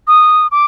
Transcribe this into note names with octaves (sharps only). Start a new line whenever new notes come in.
D#6
D6